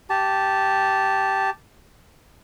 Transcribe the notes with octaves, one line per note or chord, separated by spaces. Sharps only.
G4 A5